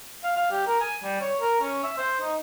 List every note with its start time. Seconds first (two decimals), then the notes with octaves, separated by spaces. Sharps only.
0.23 F5
0.36 F5
0.51 G4
0.67 A#4
0.80 G#5
1.03 G3
1.21 C#5
1.40 A#4
1.60 C#4
1.83 E5
1.97 C5
2.21 D#4